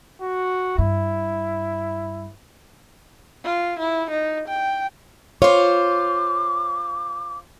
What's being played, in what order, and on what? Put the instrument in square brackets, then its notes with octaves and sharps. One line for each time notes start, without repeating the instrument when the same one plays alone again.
[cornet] F#4
[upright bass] G2 [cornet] E4
[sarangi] F4
E4
D#4
G5
[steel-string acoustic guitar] F4 C5 [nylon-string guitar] C#5 [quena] D6